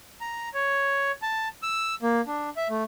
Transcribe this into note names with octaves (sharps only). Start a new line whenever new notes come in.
A#5
C#5
A5
E6
A#3
D4
E5
A3